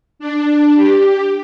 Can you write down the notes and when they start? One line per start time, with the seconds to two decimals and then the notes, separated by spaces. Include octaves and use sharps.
0.19 D4
0.75 G4